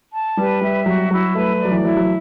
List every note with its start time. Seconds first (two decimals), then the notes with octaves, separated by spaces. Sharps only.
0.13 A5
0.37 G3 B4
0.61 G3 E5
0.86 F#3 F#4
1.11 F#3 E4
1.35 A3 B4
1.59 D5
1.65 F#3
1.71 E3
1.84 F#3 E4
1.97 F#3